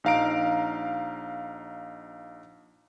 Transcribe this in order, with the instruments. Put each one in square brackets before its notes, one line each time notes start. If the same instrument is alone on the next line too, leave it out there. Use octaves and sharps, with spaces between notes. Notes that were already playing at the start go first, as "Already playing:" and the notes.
[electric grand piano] A#1 D#4 F5 A#5 D7